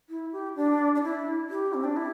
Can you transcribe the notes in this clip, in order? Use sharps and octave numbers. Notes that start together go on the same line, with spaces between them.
E4
G4
D4
D4
E4
G4
C4
D4
E4